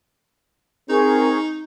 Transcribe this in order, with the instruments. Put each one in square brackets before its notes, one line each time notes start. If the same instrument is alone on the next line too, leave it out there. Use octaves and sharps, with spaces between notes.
[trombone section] C4 [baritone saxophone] D#4 [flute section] G#4 A#4 C#6